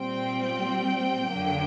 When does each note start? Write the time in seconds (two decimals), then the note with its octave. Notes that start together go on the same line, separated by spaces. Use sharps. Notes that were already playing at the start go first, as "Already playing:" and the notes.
Already playing: A#2 G3 C4 G5
1.32 F2 D3 F#3 A#3